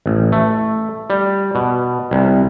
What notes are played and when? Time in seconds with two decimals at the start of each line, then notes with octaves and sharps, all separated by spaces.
0.06 A1
0.32 A3
1.10 G3
1.55 B2
2.11 C2